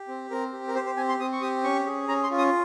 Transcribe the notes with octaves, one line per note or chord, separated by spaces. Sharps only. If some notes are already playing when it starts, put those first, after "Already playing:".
Already playing: G4
C4
C4 A#4
G4
A#4
G4 C5
C5
C4 G#5
C6
C4 D#6
C#6
G4 D#6
C#4 C#6
G#4
C#4 A#5
C6
F4
D#6